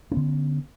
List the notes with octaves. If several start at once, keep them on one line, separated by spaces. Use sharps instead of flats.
D3 B3 C#4